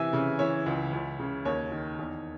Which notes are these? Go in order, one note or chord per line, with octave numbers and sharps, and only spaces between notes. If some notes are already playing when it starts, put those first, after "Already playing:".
Already playing: C3 E3 E5 G#5
C#3
E3 C#5 E5
C#2
C#2
C#3
D#2 C#5
D#3
E2